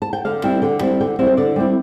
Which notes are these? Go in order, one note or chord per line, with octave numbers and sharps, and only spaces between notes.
A5
G5
D3 F5
G3 C4 E4
D3 G5
G3 C4 E4
D3 G5
G3 C4 E4
C5
D3 D5
G3 C4 E4